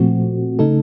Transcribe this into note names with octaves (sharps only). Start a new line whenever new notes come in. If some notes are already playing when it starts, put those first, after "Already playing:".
Already playing: A#2 F3 A3 C4 F#4
C#3 A3 D#4 A4